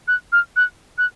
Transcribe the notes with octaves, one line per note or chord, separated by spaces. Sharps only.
F#6
F6
F#6
F#6